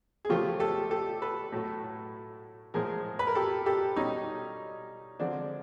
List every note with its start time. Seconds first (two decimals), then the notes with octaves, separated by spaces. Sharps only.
0.25 G#4
0.29 C#3 F3 A3 F4 G4
0.60 G4 A4
0.91 G4 A4
1.22 A4 B4
1.52 A2 F#3 A3
2.74 A2 F3 G#3 G#4 A#4
3.19 B4
3.27 A#4
3.35 G4 A4
3.66 G4 A4
3.96 B2 G3 C#4 D#4
5.19 D3 F3 G#3 C4 D4